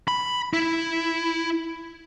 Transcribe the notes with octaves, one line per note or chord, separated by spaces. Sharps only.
B5
E4